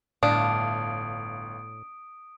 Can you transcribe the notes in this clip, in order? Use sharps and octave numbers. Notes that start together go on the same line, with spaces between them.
G1 A2 D4 F5 D#6 D7